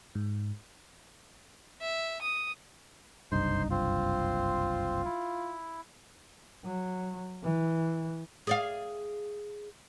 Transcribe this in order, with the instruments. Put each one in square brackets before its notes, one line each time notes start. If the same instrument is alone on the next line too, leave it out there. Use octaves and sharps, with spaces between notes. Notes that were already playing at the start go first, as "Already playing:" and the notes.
[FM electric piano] G#2
[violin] E5
D#6
[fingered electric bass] F#1 C2 G2 [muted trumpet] D#4 [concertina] C5 C6
[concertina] C4 [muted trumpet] F4
[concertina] E4
[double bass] F#3
E3
[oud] G#4 D5 F5